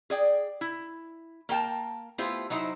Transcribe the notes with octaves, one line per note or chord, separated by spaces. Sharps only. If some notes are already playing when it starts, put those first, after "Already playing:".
G#4 D5 G5
E4
A#3 A#4 G5 A5
A3 B3 E4 F4 G4 C5
F#3 D#4 E4 C5